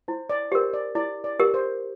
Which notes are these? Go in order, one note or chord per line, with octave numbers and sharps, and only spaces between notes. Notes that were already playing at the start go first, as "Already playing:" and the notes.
E4 C5
D5
G4 A#4 C5
D5
E4 D5
D5
G4 A#4
C5